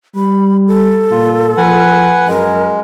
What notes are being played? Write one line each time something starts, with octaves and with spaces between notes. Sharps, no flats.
G3 B5
A4
A#2 F4
F3 B4 F#5 G#5
F#2 G#3 A#4